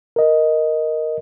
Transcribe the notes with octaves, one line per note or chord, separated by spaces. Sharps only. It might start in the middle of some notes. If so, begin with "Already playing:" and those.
A#4 D#5